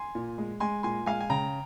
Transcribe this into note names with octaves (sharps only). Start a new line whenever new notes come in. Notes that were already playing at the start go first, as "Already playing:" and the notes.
Already playing: G#5 C6
A#2
G#3
G#3 G#5 C6
A#2 G#5 C6
G#3 F5 G#5
G#5
C#3 G5 A#5